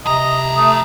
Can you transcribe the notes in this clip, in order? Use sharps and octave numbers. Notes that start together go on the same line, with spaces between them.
F2 C3 D#5 A#5
A3 D#6